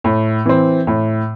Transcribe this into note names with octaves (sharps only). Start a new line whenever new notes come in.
A2
E3 C4
A2